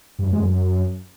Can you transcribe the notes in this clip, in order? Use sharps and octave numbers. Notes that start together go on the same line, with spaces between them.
G2
F#2
G#3
F#2